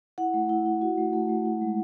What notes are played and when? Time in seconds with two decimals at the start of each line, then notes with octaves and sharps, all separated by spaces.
0.18 E4 F#5
0.34 A3
0.49 E4
0.66 E4
0.81 F#4
0.98 A3
1.13 A3
1.29 A3
1.45 E4
1.61 G#3